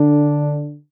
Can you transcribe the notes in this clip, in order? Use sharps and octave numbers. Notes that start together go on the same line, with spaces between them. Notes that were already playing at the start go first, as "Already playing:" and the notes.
Already playing: D3 D4